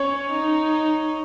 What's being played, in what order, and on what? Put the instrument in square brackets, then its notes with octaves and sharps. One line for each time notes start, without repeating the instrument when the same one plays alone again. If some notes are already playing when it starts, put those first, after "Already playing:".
Already playing: [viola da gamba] C#4 [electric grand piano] C#5
[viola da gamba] D#4